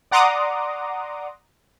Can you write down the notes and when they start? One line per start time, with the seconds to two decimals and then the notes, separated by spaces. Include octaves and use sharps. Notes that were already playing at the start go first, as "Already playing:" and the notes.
0.11 D5 F#5 A#5 C6 D6 D#6